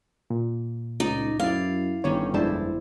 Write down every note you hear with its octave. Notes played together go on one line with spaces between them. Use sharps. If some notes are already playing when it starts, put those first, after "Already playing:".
A#2
C#2 D#4 D5
F#2 E4 D5 F5
G1 D#3 G3 C#4 C#5
F2 G#3 D4 E4 C5 A5